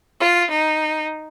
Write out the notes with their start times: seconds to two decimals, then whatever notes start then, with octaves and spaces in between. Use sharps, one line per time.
0.21 F4
0.50 D#4